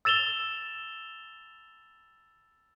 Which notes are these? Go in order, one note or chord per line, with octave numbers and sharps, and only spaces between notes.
E6 A6 E7 F7 G7